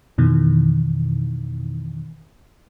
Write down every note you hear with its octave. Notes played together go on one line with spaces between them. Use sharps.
F2 B2 D#3 E3